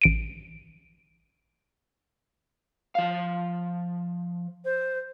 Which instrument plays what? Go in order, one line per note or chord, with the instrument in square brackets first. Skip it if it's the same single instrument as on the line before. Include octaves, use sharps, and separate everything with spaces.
[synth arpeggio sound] A1 D7 D#7
[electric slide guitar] F3 F5
[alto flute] C5